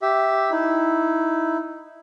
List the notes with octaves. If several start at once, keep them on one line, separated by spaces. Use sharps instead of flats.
G4 E5
D#4 E4